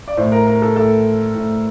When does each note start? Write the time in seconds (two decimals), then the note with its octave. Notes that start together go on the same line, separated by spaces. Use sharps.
0.08 D5
0.17 A2 C5
0.32 A#4
0.47 A#4
0.62 A4
0.76 A2 A4
1.35 A2